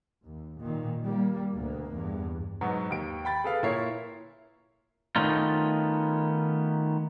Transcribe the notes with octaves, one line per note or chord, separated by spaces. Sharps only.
D#2
A#2 D#3
G3 A#3
D2 B2 A#3
E2 G2
G#2 B2 F#3 B3
D#2 D7
G5 B5 A6
G#4 A4 B4 F5
A#2 E4 A#4 C#5 C7
D#3 A3 B3 C#4 D#4 F4